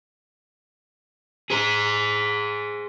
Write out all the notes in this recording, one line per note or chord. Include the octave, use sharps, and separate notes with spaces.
G#4 C5